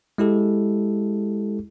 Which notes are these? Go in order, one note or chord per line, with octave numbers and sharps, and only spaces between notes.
G#3 E4 G4 A4